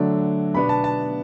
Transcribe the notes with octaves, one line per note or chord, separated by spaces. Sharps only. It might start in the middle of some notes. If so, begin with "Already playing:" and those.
Already playing: D3 F#3 A3 D4
B2 B3 D4 B5
A5
A5